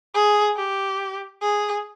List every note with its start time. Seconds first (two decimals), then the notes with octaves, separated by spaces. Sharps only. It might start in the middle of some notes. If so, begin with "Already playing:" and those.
0.14 G#4
0.57 G4
1.42 G#4